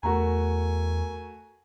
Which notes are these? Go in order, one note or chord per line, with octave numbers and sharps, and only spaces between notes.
E2 A3 F#4 A#4 G#5 A#5